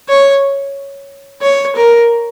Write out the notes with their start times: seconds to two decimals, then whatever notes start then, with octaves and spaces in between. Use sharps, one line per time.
0.09 C#5
1.42 C#5
1.76 A#4